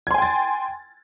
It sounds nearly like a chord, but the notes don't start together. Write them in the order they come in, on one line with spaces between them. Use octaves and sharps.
G#6 C6 G#5 G5 A6